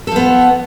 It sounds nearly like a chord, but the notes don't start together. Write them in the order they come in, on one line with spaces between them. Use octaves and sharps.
A4 F3 B3